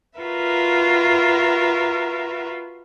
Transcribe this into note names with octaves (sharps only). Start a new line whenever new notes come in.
F4 F#4 A#4 B4 E5